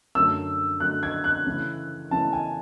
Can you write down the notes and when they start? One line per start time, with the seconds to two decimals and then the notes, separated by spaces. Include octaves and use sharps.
0.15 F#2 D3 F#3 A3 E6
0.80 F#2 D3 F#3 A3 F#6
1.03 G#6
1.24 F#6
1.46 C#3 E3 A3 C#4 E4
2.11 C#3 E3 A3 C#4 E4 A5
2.33 G#5